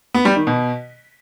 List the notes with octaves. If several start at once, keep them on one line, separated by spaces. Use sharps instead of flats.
B3
G3
D#3
B2